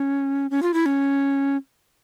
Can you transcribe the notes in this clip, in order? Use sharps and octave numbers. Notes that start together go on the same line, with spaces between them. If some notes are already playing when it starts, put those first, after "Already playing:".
Already playing: C#4
C#4
F4
E4
C#4